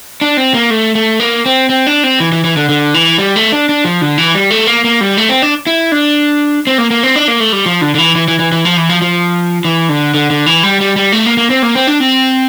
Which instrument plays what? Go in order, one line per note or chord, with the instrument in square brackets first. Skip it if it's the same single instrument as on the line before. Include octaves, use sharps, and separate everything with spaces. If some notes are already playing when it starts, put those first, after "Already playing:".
[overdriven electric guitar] D4
C4
A#3
A3
A3
A#3
C4
C4
D4
C4
E3
E3
E3
D3
D3
E3
G3
A3
D4
D4
F3
D3
E3
G3
A3
A#3
A#3
G3
A3
C4
D4
E4
D4
C4
A#3
A#3
C4
D4
A#3
A3
G3
F3
D3
D3
E3
E3
E3
E3
E3
F3
E3
F3
F3
E3
D3
D3
D3
E3
G3
G3
G3
A3
A#3
A#3
C4
A#3
C4
D4
C4